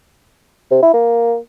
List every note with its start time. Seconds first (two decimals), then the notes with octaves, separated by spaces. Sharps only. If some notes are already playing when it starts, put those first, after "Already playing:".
0.71 C3
0.82 E4
0.94 A#3